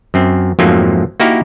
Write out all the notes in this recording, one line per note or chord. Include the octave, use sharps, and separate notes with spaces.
F#2 C4
F2 G#2 F3 F#3 A3 A#3
A#3 D#4 E4 F#4 G4 A#4